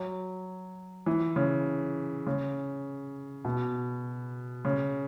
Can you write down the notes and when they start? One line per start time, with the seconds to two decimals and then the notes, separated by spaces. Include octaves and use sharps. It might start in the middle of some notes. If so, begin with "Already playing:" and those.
Already playing: F#3
1.06 E3
1.36 C#3
2.27 C#3
3.45 B2
4.65 C#3